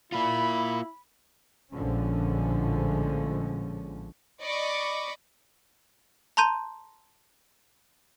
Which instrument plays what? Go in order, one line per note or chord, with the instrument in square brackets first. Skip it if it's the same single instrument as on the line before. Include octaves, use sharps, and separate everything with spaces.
[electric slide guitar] A#3 F4 [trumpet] E4 [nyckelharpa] B5
[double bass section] A#1 A2 D3 F3 G#3 C#4
[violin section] D5 D#5 B5 C#6 D6
[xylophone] A5 A#5 C6 G6 D#7